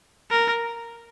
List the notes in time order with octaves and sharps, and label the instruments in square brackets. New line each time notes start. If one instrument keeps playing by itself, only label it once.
[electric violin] A#4